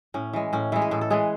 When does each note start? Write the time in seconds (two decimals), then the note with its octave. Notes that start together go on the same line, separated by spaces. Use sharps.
0.14 A2 C#4
0.33 E3 G#3
0.53 A2 C#4
0.72 E3 G#3 E4
0.82 G#4
0.91 A2 A4
1.01 A4
1.10 E3 G#3 G#4